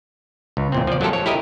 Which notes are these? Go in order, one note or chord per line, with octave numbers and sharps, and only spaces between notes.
C#2
E2 A#2 C4
F3 D5
F#3 A3 F4 G4 A4 A#4
C#5
E4 G4 A#4 D#5